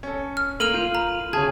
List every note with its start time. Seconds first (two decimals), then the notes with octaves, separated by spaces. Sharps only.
0.03 C#4 A4
0.37 F6
0.60 A#3 A4 A#4 F6 D#7 F7 F#7
0.74 F4 G6
0.95 A#5 B5
1.33 D2 C#3 G#4 C#5 A5 G#6